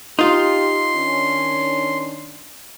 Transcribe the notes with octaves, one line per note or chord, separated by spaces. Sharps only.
D#4 F4 G4 C6
D#3 C#4 D4